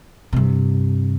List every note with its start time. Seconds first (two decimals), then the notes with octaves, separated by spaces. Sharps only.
0.33 G2 C3